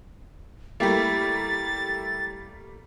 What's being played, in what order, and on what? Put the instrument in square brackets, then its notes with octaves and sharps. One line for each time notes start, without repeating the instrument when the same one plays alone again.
[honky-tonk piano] G3 A3 A#3 [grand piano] E4 G4 [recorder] A6